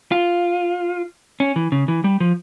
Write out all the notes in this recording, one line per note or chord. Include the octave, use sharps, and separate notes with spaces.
F4
C#4
E3
C#3
E3
G3
F3